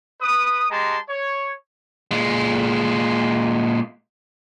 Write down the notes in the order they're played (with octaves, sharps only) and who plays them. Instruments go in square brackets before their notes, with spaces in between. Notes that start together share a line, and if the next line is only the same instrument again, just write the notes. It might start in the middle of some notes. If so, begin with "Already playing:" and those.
[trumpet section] B4 D#6
G#3 G4 A5 A#5 C6
C#5
[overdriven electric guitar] A#2 G#3